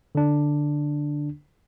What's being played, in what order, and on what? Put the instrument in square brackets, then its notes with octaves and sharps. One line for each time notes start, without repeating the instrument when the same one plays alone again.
[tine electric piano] D3 D4